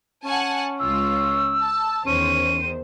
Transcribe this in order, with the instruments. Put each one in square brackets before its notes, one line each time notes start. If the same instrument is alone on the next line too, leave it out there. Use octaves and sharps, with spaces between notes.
[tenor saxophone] C#4 [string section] F#5 G#5 A5
[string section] C#2 F4 [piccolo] E6
[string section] A5
[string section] E2 D#3 C5 [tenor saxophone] C#4 [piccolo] D#7